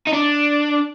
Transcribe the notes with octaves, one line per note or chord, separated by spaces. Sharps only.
D#4
D4